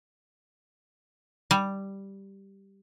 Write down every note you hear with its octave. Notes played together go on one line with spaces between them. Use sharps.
G3